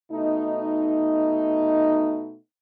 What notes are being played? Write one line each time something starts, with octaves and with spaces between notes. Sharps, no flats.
B2 A3 D#4